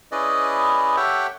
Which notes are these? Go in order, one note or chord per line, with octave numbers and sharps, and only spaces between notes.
C#4 E4 G#4 B4 D5 D#5
G4 A4 C#5 E5 F#5 G5